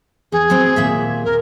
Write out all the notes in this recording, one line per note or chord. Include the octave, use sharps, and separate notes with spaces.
E2 G#4
F#3 C4
D#2 A#2 E5
A#4